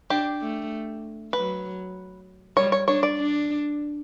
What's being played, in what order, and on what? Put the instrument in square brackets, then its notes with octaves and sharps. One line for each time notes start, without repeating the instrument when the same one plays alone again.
[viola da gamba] D4 [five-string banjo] G4
[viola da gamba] A3
[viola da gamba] F#3 [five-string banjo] B4
[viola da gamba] G3 [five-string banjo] C#5
[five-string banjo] C#5
[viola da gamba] D4 [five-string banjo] C#5
[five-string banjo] D5
[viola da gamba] D4